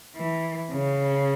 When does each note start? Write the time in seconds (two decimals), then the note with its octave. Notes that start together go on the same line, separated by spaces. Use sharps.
0.16 E3
0.71 C#3